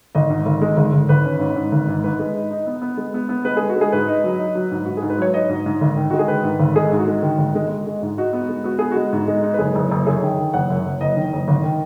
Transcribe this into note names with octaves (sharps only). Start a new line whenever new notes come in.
G#1 D#5
G#2
G#1
G#3
G#1
G#1
G#1 B4
C#4
G#2
G#2
G#1
G#2
G#2 B4
G#3
D#4
D#4
B3
B3
G#3
B3
B3
G#3 B4
G#3 G#4
F#4
G#3 G#4
G#2 B4
D#4
F#3
D#4
F#3
G#2
G#2 F#4
G#2 G#4
B4
F#3 C#5
D#4 D#5
G#2
G#2
G#1
D#3
G#3 F#4
G#4
D#3 B4
G#2
G#1
G#3 G#4
G#2
F#4
G#3
D#3
G#1
G#3
G#3
G#3
G#2
D#4 F#4
B3
G#3
B3 F#4
B3 G#4
G#3 F#4
G#2
G#3
D#4
B4
F#1 G#4
F#1
F#1
F#2 G#4
D#3
D#3
F#1 F#5
F#2
F#1
F#1 D#5
D#3
F#1
G#1
D#3